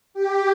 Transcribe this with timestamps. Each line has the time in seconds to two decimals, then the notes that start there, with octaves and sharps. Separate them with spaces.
0.14 G4